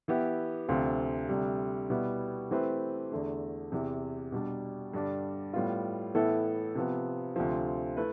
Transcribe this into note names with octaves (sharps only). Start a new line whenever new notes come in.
E3 B3 E4 G4
D2 C3 F3 C4 F4
D2 C3 G3
B2 G3 B3 E4
E3 A3 C4 G4 B4
E2 D3 A3
E2 C3 E3
B2 G3 D4
G2 D3 G3 D4
A2 G3 B3 F4
A2 E3 B3 E4 A4
C3 F3 B3
D2 C3 F3
A3 E4 B4